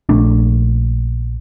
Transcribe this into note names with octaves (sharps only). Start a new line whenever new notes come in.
A#1 A3 D4